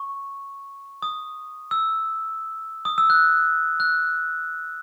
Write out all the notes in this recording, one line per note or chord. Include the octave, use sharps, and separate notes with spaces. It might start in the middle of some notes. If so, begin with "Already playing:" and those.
Already playing: C#6
D#6
E6
D#6
E6
F#6
F#6